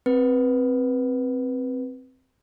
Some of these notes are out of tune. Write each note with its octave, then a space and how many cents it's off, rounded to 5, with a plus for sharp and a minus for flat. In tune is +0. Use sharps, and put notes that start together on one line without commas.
C4 +0 B4 -10